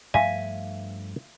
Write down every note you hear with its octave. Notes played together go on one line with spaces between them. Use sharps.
G2 F3 A3 E5 F5 G#5